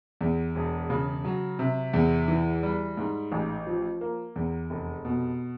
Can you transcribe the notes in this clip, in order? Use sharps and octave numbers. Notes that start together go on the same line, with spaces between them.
E2
E1
C#3
F#3
C3
E2
E3
G3
G#2
A1
F3
A#3
E2
F1
B2